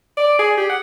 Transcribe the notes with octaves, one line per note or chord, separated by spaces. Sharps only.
D5
G#4
G4
F#5